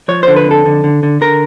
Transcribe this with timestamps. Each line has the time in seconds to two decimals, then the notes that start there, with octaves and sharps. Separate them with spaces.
0.08 F3 C#5
0.23 D3 C5
0.36 B4
0.46 F2
0.51 A4
0.65 D3
0.84 D3
1.03 D3
1.21 D3 A#4